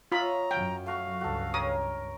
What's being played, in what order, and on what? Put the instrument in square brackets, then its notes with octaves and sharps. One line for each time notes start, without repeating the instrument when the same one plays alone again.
[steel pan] F4 B5 [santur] C#5 D#5 E5 [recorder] A#5
[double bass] F#2 F#3 [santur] F5 [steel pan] G5
[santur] A3 F#4 C#6 [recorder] F5
[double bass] C#2 G2 [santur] F#4 A4
[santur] A#4 C#5 G5 [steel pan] D#6